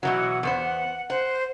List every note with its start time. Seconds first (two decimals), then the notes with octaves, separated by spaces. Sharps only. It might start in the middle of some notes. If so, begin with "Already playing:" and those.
0.03 B2 E3 F#3 F#5
0.43 E2 B3 C5
1.10 C5 F#5